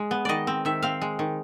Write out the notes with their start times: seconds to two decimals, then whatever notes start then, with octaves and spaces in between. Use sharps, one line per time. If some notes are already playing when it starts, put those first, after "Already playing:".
Already playing: G#3
0.11 B3
0.25 D#3 D5 D#5
0.47 C4
0.65 D#3 E5
0.82 C4 F5
1.02 G#3
1.19 D#3